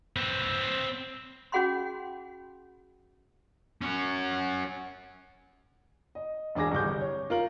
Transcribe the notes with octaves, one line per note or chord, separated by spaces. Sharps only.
C4 B4
C#4 F#4 G#4 F#5 B5 C6
C#4 F#4
D#5
E1 D4 G#4 D6 A#6
G1 C2 D6 G6
C#5
F4 A#4 F#7